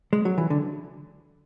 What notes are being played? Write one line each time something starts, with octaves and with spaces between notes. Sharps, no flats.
G#3
F#3
E3
D3